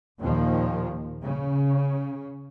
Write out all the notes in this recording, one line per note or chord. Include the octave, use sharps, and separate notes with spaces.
D#2 A#2 D#3 F3
C#3